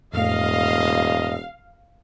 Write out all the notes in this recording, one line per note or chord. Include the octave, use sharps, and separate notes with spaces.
E1 F2 A2 A3 D#5 F5